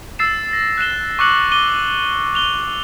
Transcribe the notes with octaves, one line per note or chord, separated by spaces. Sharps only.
E6 A6 C7 E7
A#6
F#6 C7 E7 G7
C#6 D6 F#6 C#7 F#7
D6 D#7 G7
F#6 F7 G7